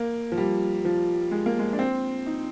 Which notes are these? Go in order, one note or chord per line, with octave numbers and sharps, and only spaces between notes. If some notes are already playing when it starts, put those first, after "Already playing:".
Already playing: A#3
F3
G3
F3
G#3
A#3
G#3
D4
C4
D#4